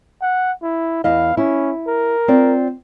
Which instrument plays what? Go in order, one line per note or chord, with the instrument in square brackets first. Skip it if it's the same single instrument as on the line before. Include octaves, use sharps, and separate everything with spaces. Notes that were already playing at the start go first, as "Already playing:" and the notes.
[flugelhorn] F#5
E4
[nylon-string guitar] E2 E4 D#5 [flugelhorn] F5
[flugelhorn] C#4 [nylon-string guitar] E4
[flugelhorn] A#4
[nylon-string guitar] C4 F4 D5